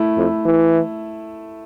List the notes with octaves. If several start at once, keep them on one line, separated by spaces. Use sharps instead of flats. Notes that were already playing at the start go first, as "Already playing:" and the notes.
Already playing: A3 E4
F2
E3